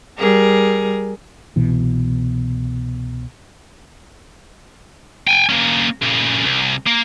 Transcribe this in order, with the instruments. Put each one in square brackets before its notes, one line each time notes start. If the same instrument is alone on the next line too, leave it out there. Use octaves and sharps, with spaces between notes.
[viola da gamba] G3 G#4 A#4
[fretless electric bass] C2 B2 E3
[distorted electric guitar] G5 G#5
A#3 C#4
A#2 C#3
C2
A#3